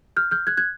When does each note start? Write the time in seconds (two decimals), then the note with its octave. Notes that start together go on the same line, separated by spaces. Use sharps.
0.16 F6 G6
0.31 F6 G6
0.47 F#6 G#6
0.57 F#6 G#6